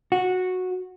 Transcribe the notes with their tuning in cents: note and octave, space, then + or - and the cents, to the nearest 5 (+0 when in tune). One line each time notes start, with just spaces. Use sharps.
F#4 -10